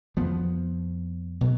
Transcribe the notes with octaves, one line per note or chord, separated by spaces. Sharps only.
F2 F3 B3
B2 F#3